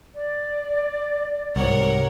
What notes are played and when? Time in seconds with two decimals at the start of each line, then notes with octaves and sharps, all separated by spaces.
0.14 D5
1.56 C2 G#2 C3 A#4 C#5 F#5